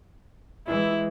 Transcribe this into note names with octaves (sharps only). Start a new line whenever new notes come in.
E3 G#3 E4